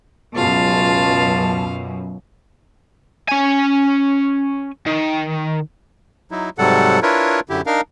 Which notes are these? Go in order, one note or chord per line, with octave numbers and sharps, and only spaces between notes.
C#2 F#2 B2 F4 F5 A5
C#4 G#5
D#3
F#3 D#4 E4
G#2 C3 F#3 G3 A4 F#5
D4 E4 F4 A#4 B4 C#5
F#2 D3 E4 G4
D4 D#4 A#4 F5